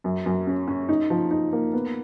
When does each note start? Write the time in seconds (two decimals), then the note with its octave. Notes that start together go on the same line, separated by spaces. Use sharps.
0.04 F#2
0.26 F#2
0.47 C#4
0.68 C#4
0.89 D#4
1.10 F3
1.31 D#4
1.53 A#3
1.73 B3